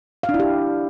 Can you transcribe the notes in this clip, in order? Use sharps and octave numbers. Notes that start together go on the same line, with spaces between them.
F5
D4
E4
G4